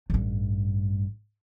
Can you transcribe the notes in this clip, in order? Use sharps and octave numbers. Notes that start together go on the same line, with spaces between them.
A1 G2